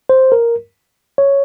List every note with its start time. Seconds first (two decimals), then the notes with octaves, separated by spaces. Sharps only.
0.09 C5
0.32 A#4
1.18 C#5